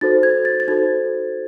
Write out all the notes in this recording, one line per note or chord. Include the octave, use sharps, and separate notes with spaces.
D#4 F#4 A4 C5 A6
G#6
A6
A6
D#4 F#4 A4 C5 G#6